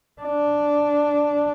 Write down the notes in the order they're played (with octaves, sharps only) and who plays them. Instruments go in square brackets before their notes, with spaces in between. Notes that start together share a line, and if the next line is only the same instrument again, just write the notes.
[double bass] D4